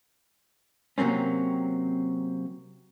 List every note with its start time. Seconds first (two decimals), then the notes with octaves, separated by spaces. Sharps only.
0.98 C3 F#3 A#3 C4 C#4